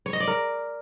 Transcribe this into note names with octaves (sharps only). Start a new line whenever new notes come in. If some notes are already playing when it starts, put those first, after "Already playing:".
C#5
D#5
D5
A#4